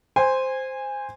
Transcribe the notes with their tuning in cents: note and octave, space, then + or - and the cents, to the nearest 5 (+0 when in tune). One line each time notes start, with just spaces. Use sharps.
C5 -5 G#5 -20